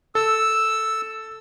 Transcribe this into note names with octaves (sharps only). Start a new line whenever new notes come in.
A4 E6